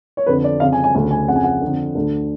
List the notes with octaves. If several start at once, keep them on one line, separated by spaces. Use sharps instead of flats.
C#5
F2 D3 B4
D5
F2 C#3 F5
G#5
G#5
D2 C#3 G#5
G#5
F2 C#3 F#5
G#5
F#5
D3
F2
D2 D3